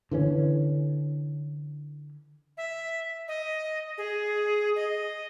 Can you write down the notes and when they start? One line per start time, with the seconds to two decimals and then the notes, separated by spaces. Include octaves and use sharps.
0.11 D3 E3 A3 C#4
2.57 E5
3.28 D#5
3.98 G#4
4.76 D#5